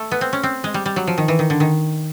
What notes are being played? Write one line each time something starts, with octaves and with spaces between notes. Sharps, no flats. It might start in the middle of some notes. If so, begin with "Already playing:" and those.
Already playing: A3
B3
C4
C#4
C4
G#3
G3
G3
F#3
F3
D#3
E3
D#3
D3
D#3